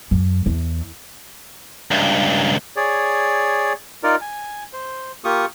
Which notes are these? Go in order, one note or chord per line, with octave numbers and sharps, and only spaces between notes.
F#2
E2
C#2 G2
G#4 C#5 D5
D#4 F4 A#4 D5
G#5
C5
A#3 F4 G4 C#6 D#6